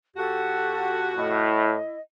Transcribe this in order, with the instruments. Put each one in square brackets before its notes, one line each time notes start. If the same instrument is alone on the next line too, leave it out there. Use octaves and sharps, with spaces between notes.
[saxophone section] F2 F#4 [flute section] G4 A4 A5
[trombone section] A2 [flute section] E4 D#5